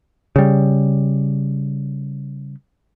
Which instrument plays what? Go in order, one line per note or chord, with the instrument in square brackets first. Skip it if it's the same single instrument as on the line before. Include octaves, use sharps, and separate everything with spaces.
[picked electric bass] C#3 G3